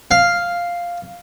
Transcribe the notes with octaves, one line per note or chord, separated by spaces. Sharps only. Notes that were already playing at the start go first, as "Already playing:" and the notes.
F5